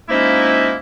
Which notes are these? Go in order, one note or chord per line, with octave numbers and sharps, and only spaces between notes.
F3 G#3 A#3 C#4 D#4 E4